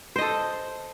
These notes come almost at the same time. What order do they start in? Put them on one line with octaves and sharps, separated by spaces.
C5 D#5 A4